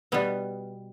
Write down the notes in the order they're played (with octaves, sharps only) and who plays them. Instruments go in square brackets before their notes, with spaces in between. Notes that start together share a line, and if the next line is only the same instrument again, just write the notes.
[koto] B2 G3 B3